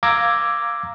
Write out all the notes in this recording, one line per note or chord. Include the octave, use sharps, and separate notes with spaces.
F5 A#5 D6 E6 G#6 A#6